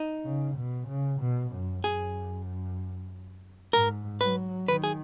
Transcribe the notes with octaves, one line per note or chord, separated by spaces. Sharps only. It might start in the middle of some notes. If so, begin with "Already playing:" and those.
Already playing: D#4
C#3
B2
C#3
B2
F#2
F#2 G#4
G#2 A#4
F#3 B4
D#3 B4
G#4